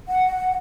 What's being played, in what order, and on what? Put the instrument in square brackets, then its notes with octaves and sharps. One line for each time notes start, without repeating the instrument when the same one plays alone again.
[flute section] F#5